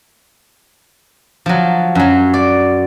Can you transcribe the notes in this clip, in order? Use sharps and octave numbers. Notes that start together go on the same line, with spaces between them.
F3 F#3
F#2 F#3
D5